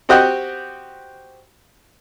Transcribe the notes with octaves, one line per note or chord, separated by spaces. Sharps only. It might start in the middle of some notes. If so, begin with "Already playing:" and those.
C4 F#4 G4 D#5 F#5 G5